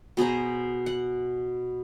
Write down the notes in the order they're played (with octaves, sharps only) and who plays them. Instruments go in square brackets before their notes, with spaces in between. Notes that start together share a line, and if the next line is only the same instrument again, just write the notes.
[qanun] B2 G#4 C5 A#5
F#5